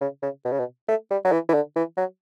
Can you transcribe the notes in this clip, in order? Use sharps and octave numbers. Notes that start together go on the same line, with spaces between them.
C#3
C#3
B2
C#3
B2
A3
G3
F#3
E3
E3
D3
E3
F#3